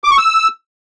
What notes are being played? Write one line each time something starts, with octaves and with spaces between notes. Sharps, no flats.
D6
C#6
E6